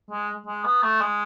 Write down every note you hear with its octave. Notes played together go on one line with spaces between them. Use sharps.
G#3
G#3
B3
A3
G#3